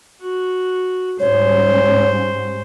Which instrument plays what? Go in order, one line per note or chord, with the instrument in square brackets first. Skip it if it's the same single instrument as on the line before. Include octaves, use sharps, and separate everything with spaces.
[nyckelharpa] F#4
[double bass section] G#2 G3 C#4 [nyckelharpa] C5 [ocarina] C#5